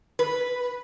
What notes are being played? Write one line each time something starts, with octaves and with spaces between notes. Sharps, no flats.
B4